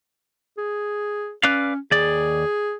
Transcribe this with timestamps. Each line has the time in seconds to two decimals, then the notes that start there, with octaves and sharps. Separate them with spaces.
0.58 G#4
1.43 C#4 B4 D5 F5
1.91 D#2 G#4 D5